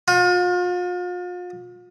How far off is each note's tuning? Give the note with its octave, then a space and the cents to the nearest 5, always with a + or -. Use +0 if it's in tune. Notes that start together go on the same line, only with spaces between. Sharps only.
F4 +40